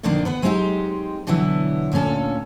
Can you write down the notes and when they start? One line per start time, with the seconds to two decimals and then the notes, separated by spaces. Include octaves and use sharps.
0.03 F2 B2 D3 D#3 A#3 D4
0.25 B3 B4 F#5
0.42 F#3 G#3 B3 C4 D#4 G4
1.27 B2 D3 E3 F#3 B3 E4
1.92 D2 A#2 D3 C#4 A4